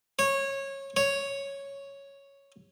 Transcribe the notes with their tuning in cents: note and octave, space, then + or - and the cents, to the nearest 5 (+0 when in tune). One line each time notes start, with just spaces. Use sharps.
C#5 -20
C#5 +0